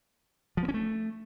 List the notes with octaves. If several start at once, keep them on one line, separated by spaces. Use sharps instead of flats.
F3
B3
C#4
A3